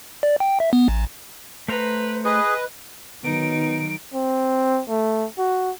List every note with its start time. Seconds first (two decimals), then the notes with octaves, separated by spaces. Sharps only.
0.23 D5
0.40 G5
0.60 E5
0.73 B3
0.88 A1
1.68 A3 B4 C5 A#5
2.25 G#4 B4 D#5
3.24 D#3 F#3 B3 D#4 D7
4.14 C4
4.89 A3
5.38 F#4